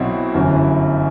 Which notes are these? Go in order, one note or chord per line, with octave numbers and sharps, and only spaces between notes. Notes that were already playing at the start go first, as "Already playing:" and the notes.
Already playing: B1 B2 F#3 C4 E4
G1 F#2 E3